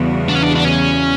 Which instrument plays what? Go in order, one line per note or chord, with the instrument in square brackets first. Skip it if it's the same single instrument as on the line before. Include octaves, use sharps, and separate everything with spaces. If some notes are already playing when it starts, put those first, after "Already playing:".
Already playing: [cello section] E2 C#3 G3 B3 F#4
[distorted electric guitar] D4
C#4
D4
D4
C#4